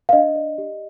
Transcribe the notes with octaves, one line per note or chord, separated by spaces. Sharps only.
F5
D4 D#5
D5
G4